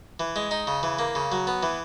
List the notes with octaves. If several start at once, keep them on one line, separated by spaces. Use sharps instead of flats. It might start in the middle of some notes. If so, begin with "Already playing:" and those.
E3
G#3
D#4
C#3
E3
A#3
C#3
F#3
B3
E3